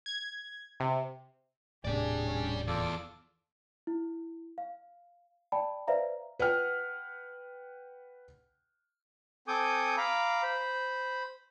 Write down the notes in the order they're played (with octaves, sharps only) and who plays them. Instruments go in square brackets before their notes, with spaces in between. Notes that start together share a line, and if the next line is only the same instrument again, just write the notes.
[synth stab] G#6
C3
[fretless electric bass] D#1 A2 C3 [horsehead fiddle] D4 G#4 [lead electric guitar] G4 D5
[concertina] C#4
[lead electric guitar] E2 [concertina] F4 A4 D6 [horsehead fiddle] D5
[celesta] E4
F5
D5 G5 A5 B5
B4 C5 D5 E5 F5 A#5
[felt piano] B4 F#5 G5 F6
[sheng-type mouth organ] C4 A4 G#5 D6 D#6 G6
F5 A#5 B5 D6
C5 B5